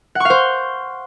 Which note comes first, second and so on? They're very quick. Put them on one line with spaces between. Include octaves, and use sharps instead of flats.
F#5 C#6 F5 C5